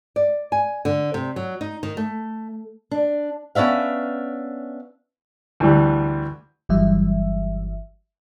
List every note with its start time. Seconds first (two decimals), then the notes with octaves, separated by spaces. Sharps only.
0.16 D5
0.52 G#5
0.85 D3
1.14 C3
1.36 F#3
1.61 D#4
1.83 D#3
1.97 A3
2.91 D4
3.55 B3 C#4 D4 E5 F5
5.60 D2 E3 G3
6.69 G1 E3 F#3 G3 E5